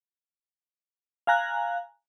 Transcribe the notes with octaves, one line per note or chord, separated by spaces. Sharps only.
F5 G#5 A#5 F#6